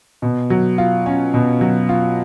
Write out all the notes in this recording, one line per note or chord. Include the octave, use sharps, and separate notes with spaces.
B2
F#3
F4
C#4
B2
F#3
F4